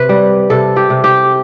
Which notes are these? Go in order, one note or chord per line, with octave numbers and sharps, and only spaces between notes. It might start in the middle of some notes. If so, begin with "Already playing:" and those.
Already playing: C3 B4
G3
C3 A4
G4
C3
G4